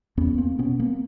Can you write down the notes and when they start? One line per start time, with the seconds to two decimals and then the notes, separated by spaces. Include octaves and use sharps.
0.17 E2 B3 C#4
0.38 A#3 C4
0.59 B2 B3 C#4
0.80 A#3 C4